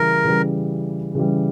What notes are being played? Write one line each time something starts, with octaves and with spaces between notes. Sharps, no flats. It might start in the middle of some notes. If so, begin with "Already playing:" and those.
Already playing: C#3 E3 G3 A#4
C#3 E3 G3
C#3 E3 G3